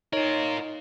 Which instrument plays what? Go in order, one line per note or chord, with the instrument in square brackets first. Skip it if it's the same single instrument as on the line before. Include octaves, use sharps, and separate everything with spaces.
[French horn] D#4 [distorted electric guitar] F4 A#4 [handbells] C#5